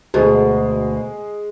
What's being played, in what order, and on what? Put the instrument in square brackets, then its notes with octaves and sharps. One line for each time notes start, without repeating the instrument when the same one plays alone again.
[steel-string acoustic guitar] D2 B2 [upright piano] G#3 G#4